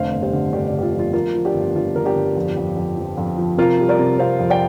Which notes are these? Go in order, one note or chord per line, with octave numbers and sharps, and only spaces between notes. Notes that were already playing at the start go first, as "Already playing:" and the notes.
Already playing: F1 D3 C5 F5
G1
G4 C5
D3
G1 D4 G4
D4
D3
G4
F4
F3
F4
F3 F4 A#4
F3
D4 G4
G1
G1 F4
G1 A#4
D4 G4
G1
F2
F2
F2
F3
F2
F3
C3 F4 A#4
G3
A#4 D5
C3
C3 C5 F5
F2
D5 G5